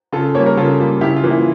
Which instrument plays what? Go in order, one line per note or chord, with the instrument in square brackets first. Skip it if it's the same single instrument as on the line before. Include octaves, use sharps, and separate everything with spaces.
[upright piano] C#3 F4 A4
G3 A#3 C#5
A#4
C#3 F4 A4
G3 A#3
C#3 E4 G4
F4
E3 A#3
E4